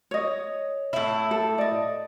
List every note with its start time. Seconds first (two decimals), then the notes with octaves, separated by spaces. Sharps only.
0.11 C#5 D#5
0.93 A2 E4
1.31 A4
1.58 D5 D#5